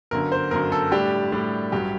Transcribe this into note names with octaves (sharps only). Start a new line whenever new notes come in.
G1 F#2 D3 A#4
C5
G1 F#2 D3 A#4
A4
A2 G3 D4 G4
A2 G3 D4
A1 G2 F#3 G4